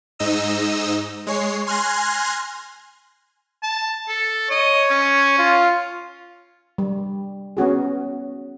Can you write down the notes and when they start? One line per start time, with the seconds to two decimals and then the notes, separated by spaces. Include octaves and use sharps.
0.19 G#2 D#4 D#5 E6
1.27 G#3 C#5 C7
1.67 G#5 C6 F6 F#6 G#6 A#6
3.63 A5
4.08 A4
4.51 C#5 D#5
4.90 C#4
5.39 F4
6.78 G3
7.57 B3 C#4 F#4 G#4